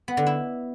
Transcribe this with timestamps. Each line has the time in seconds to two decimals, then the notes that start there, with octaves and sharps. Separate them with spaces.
0.08 B3
0.17 D3
0.26 E4